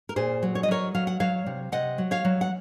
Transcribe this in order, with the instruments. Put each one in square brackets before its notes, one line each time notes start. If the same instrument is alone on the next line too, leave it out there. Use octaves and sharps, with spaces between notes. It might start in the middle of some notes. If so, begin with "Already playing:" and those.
[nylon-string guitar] A#4
A#2 G#4 C5
F#3
C#5
D#5
F#3 A#4 C#5
F#3 F5
F#5
F#3 C#5 F5
C3
C3 D#5 F#5
F#3
C#5 F5
F#3
F#5